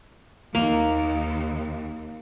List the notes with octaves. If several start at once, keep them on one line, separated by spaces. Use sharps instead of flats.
D#2 A#3